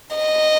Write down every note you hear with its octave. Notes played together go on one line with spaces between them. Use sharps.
D#5